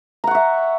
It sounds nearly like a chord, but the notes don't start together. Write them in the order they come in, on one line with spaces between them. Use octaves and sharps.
A#5 F#5 C#6 E5